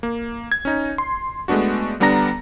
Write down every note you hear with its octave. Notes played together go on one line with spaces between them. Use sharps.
A#3
G#6
C#4 D#4
C6
G#3 A3 B3 D4 F#4
D3 G3 B3 D4 A#5 A#6